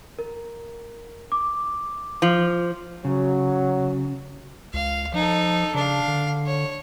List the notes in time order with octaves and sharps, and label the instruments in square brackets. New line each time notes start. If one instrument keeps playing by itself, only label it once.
[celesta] A#4
D6
[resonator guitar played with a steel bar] F3
[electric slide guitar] C#3 [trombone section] F#3
[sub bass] C#2 [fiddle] F5
[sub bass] F3 [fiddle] D#4 A4
[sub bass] C#3 [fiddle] D4 F5
[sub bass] D3
[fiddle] C#5